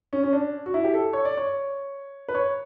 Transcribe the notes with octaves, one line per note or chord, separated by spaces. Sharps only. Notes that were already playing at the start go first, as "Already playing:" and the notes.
C#4
C#4
D4
F#4
E4
G4
A4
C#5
D5
C#5
B4
C#5